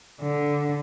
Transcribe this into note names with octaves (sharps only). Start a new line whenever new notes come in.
D3